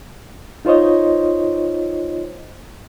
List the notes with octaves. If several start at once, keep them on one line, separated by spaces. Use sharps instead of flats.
D#4 F4 C5 C#5 D#5